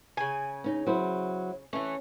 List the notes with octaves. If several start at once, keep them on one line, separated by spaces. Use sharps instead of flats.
C#3 G#5
C#4 D#4
F#3 E4 C5
E3 A3 C#4